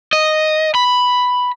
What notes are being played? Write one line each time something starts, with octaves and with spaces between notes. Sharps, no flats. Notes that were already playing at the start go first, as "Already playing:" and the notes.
D#5
B5